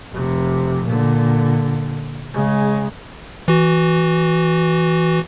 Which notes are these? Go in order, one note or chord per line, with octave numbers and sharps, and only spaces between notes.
F1 C3
A#2 D3
C#3 G#3
E3 F#4